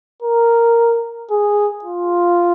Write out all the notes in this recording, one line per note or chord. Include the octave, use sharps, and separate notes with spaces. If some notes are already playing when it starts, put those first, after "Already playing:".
A#4
G#4
F4